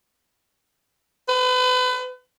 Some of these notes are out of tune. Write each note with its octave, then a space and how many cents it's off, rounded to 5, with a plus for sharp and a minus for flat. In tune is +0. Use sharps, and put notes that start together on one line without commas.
B4 +35